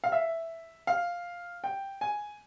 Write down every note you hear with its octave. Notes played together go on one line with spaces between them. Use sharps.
F5
E5
F5
G5
G#5